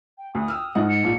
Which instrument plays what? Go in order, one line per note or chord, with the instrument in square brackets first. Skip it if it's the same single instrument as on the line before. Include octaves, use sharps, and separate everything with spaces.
[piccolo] G5
[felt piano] D2 [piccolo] D#6
[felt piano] G5 E6 F6
G#2 D#4 F#5
[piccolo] C#7
[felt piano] A#1